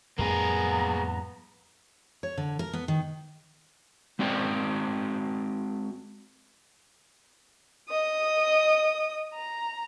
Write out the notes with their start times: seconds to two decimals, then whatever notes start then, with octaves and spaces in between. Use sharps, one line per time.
0.19 F2 A2 G3 A#3 B3 G#4 A#5
2.23 C#5
2.38 D3
2.59 A#4
2.73 B3
2.88 D#3
4.19 G#3 C4 F#4 D5 G5
7.90 D#5 D#6
9.34 A#5